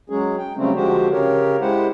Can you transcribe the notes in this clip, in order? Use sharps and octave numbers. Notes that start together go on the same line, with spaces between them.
F#3 G#3 C#4 G#4
G5
C#3 F#3 G3 A3 C4 C#4
D3 F3 G#3 F#4 G4 C5
C#3 G4 A#4 C#5
G#3 E4 G4 C5 F#5